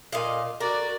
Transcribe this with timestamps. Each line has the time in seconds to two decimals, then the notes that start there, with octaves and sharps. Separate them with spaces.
0.12 A#2 D#5 F5
0.60 F#4 A#4 D5